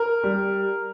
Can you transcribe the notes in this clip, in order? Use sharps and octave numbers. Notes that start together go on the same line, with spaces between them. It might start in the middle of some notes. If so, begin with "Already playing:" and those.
Already playing: A#4
G3